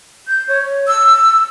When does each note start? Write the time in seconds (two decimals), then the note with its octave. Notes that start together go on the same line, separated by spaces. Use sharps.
0.27 G6
0.48 C#5
0.87 E6